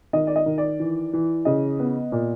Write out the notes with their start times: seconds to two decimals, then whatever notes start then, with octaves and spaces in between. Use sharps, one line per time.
0.13 D#3 D#5
0.27 D5
0.36 D#5
0.46 D#3
0.58 D5
0.80 E3
1.13 E3
1.45 C#3 D#5
1.80 B3
2.12 A#2